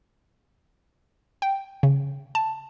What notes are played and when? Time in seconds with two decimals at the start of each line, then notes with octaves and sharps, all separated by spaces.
1.42 G5
1.83 C#3
2.35 A5